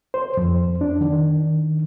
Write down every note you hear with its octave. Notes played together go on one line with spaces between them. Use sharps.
C5
F2
D4
D#3